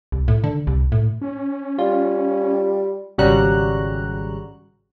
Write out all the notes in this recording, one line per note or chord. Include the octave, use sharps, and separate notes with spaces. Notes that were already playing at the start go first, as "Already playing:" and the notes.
C2
A2
D3
C2
A2
C#4
G3 F4
G#1 C#3 G3 F#4 A#5 F#6